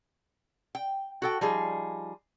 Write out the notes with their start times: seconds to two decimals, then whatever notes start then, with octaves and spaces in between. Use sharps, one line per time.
0.75 G5
1.22 F#4 A4 G5
1.41 F3 G3 D#4 G#4